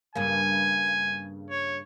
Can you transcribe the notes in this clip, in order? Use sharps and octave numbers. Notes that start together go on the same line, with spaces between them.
G2 C#3 A#3 G#5
C#5